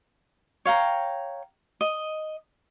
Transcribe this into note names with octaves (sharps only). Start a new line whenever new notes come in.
C#5 F5 G5 A#5
D#5